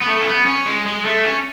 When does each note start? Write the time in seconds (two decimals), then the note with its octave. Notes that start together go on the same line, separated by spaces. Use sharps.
0.01 B3
0.07 A3
0.21 C#4
0.27 B3
0.46 C#4
0.66 G#3
0.86 G#3
1.05 A3
1.25 C#4